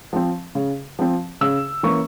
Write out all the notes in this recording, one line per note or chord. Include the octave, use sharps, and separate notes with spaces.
F3 C4
C#3
F3 C4
C#3 E6
E3 A#3 C#4 C#6